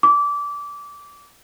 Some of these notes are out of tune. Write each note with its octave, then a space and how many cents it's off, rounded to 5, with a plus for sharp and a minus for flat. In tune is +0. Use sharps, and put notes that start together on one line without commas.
D6 -20